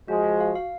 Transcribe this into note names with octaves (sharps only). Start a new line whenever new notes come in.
F3 G#3 F#4
F#4
F5
F5